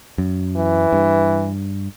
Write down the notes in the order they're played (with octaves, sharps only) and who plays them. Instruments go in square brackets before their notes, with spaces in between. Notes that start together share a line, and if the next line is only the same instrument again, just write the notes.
[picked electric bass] F#2
[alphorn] E3
[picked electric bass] G2